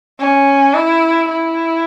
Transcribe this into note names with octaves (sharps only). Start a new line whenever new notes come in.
C#4
E4
E4